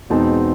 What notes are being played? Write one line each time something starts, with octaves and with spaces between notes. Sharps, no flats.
E2 B2 G#3 C4 D#4 A5